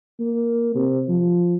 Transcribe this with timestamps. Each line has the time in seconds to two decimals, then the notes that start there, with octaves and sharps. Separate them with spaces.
0.20 A#3
0.75 C3
1.08 F3